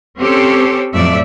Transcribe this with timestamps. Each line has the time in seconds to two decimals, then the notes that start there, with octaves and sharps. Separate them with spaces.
0.21 C4 C#4 G4 A4 C5 C#5
0.93 F2 A2 F#3 A3 D5 E5